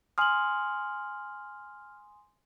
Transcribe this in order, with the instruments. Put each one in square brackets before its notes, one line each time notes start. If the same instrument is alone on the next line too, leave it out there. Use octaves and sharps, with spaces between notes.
[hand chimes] G#5 C6 D#6 [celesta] F6 F#7